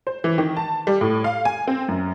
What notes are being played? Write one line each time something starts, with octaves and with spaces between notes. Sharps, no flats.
C5
E3
D#3
A5
G3
A2
F5
G#5
C4
F#2